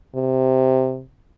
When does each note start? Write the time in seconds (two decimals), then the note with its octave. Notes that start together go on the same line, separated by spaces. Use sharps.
0.15 C3